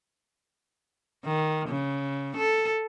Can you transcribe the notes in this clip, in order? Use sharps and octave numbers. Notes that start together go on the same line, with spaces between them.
D#3
C#3
A4